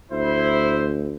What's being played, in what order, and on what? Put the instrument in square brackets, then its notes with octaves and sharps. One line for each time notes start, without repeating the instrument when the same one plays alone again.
[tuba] D2 [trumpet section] E4 C5